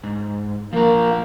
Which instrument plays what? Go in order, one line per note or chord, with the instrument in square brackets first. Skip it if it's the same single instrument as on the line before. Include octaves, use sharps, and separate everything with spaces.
[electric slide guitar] G#2
[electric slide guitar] F3 A#4 [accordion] A#3